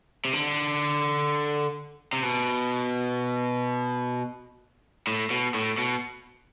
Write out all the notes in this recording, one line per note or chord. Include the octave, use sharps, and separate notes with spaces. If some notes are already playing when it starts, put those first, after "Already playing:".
C3
D3
C3
B2
A2
B2
A2
B2